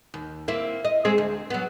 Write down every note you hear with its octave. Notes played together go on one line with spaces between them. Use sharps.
D#2
A#3 C4 E4
D#5
G#3 C4 G#4
D2
F#3 B3